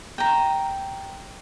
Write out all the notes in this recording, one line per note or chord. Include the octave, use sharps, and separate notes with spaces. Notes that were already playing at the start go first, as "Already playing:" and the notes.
G5 A#5